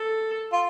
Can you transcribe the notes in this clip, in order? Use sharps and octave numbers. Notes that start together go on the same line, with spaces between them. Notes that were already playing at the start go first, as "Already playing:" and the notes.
Already playing: A4
F4